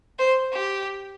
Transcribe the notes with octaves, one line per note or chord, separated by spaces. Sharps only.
C5
G4